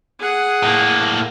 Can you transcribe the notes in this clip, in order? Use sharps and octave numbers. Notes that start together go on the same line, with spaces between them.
G#4 F#5
A2 A#3